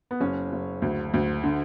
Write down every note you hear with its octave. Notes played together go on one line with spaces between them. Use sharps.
B3
F#1 C#4
F#1
D2
D2
D3